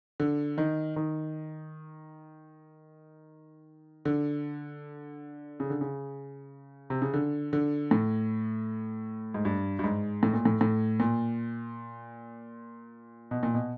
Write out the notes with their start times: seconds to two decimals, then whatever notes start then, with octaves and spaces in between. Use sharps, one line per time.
0.20 D3
0.58 D#3
0.96 D#3
4.05 D3
5.60 C#3
5.70 D3
5.81 C#3
6.90 C3
7.02 C#3
7.14 D3
7.53 D3
7.91 A2
9.34 G#2
9.45 G2
9.79 G2
9.84 G#2
10.23 A2
10.34 A#2
10.45 A2
10.61 A2
11.00 A#2
13.31 B2
13.43 A#2
13.54 B2